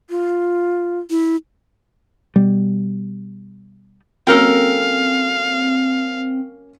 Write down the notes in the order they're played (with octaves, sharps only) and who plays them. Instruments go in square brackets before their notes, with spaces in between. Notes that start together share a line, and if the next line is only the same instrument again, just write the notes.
[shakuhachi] F4
[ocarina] E4
[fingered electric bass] B2 G3
[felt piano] F#3 A#3 C#4 [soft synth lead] C4 [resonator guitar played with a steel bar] A4 A#4 G5 [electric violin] F5